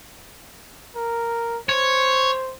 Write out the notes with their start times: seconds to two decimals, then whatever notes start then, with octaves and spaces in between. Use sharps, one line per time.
0.96 A#4
1.69 C5 C#5